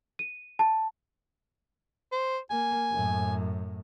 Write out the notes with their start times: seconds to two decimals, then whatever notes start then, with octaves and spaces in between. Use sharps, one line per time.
0.19 D#7
0.59 A5
2.12 C5
2.51 A#3 G#5
2.92 F#2 A2